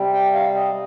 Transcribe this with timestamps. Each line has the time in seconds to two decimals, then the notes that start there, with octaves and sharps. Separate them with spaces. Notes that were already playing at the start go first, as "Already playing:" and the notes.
Already playing: C3 G3 C4
0.13 G5
0.33 F5
0.54 D#5